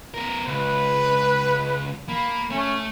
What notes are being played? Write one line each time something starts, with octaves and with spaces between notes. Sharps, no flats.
B3 A#4
C#2 B4
A#3 B5
A3 C#4